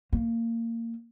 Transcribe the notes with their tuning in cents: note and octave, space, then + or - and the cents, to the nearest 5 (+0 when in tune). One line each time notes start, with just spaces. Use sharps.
A#3 -20